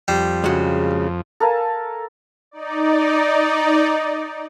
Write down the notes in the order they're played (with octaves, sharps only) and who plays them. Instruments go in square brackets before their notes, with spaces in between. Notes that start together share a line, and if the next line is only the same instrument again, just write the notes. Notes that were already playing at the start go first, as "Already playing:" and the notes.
[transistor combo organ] F2 [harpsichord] G3 C5
[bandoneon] C#3 [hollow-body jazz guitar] G#3 F#4
[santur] A4 A#4 F5 G#5
[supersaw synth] D#4 D5